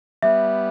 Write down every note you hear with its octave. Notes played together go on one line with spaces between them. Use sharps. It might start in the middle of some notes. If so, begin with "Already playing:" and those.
G3 B3 E5